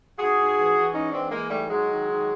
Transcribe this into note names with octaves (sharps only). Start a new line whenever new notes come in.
G#2 F#4 G#4
G#2
E3
E3
G#2 C#4 D#4
E3 C4 D4
E3 G#3 A#3
G#2 G3 A3
G#2 F#3 G#3
D#3
D#3